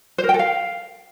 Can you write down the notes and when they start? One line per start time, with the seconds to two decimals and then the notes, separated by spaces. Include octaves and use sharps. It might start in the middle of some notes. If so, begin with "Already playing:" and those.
0.18 C5
0.24 A#4
0.29 G5
0.34 A4
0.39 F5